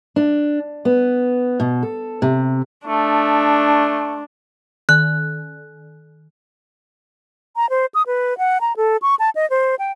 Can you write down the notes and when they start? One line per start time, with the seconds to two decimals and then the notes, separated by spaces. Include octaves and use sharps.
0.16 D4
0.85 B3
1.60 B2
1.83 A4
2.22 C3
2.87 A3 D4
4.89 D#3 F#6
7.56 A#5
7.70 C5
7.95 D#6
8.07 B4
8.38 F#5
8.61 A#5
8.77 A4
9.02 C#6
9.19 A5
9.35 D#5
9.50 C5
9.79 G5